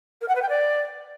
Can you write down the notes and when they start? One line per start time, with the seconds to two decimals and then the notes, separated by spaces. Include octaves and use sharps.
0.21 A#4
0.28 F#5
0.35 B4
0.42 G5
0.49 D5